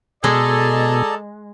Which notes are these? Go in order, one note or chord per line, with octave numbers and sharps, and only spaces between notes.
B2 G#3 G#4 A4 D5 D#5 A5 A#5